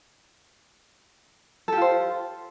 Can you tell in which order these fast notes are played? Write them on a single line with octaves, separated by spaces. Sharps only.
A4 G4 F4 C5